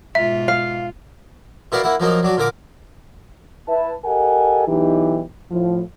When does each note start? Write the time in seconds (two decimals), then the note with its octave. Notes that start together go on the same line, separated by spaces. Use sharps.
0.15 G#2 B2 F4 E5
0.48 F5
1.72 B2 E4 A#4 B4 D5 F5
1.84 A#3 E4 F#5
2.00 F3 F#3 A#3 D#4
2.23 F#3 D4 F#4
2.37 A#2 D3 A#4 D6
3.68 E4 B4 E5 A5
4.05 G4 A4 A#4 D#5 F#5 G#5
4.68 B1 E3 D#4 G4
5.51 A2 F3